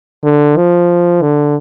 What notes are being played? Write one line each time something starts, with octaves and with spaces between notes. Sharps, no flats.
D3
F3
D3